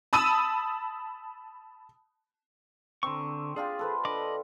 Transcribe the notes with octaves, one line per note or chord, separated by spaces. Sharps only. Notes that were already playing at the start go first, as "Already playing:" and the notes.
A5 B5 D#6 E6 D#7
D3 C4 A#5 C#6
D4 F4 G4 G#4
A4 B4 C5
D3 D#5 B5 D6